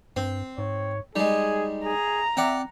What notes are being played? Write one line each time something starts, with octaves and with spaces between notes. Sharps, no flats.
G2 C4
G#2 C#5
G3 G#3 D#4 G#4
G#4 A#5
C4 D5 E5 F#5 G5